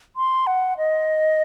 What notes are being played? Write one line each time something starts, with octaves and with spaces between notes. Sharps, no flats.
C6
F#5
D#5